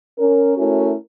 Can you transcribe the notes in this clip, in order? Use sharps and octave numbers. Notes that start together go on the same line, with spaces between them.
C#4 A#4
A3 C#4 E4 F#4 A#4